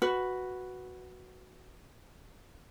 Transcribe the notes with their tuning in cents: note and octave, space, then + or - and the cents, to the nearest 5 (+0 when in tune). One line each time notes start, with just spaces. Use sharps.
F#4 +0 B4 +0